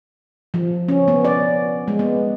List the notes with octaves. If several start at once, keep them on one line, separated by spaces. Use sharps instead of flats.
F3
C#4
B3
D5
G#3
B3